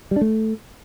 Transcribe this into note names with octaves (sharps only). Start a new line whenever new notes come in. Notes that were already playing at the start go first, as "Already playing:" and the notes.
G3
D4
A3